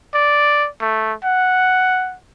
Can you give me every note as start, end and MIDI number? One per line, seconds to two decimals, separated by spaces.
0.14 0.68 74
0.81 1.13 57
1.24 2.16 78